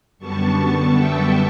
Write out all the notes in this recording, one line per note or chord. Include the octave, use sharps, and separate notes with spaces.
F#2 D3 G3 B3 A5 C#6
E5 G5